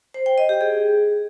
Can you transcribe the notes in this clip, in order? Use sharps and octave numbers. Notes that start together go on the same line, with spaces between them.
C5
G5
D#5
G4
G#4